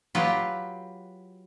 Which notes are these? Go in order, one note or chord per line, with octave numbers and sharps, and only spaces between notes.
F#3 F4 G4 B4